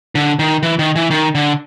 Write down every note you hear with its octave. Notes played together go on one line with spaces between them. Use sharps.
D3
D#3
E3
D#3
E3
D#3
D3